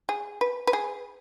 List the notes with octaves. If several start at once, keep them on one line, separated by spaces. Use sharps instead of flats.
G#4
B4
B4
G#4